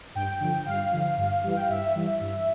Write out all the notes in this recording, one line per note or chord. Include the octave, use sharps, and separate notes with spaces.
G2 G5
D3 F3
G2 F5
D3 F3
G2
E3 G3
G5
F5
G2 E5
E3 G3
G2